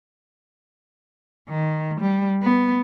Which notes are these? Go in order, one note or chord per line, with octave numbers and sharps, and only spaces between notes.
D#3
G3
B3